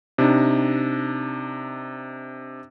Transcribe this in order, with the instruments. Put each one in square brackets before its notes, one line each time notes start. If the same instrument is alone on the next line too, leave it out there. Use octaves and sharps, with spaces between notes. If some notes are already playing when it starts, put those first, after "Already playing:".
[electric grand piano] C3 D4 D#4